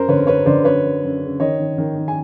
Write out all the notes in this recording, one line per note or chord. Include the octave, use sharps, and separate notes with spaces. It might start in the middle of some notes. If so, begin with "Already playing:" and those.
Already playing: F#2 A#4 C5
D3 B4 C#5
F#2 B4 C#5
D3 C5 D5
F#2 B4 C#5
F#2
F#2
C#3
D#3 C#5 D#5
D#3
D#3
D#3
G#5